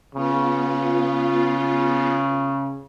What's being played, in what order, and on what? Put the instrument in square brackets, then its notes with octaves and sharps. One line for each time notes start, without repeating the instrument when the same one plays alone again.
[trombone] C#3 [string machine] B3 F4